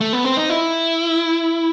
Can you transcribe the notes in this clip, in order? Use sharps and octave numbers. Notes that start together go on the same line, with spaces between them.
A3
B3
C4
D#4
E4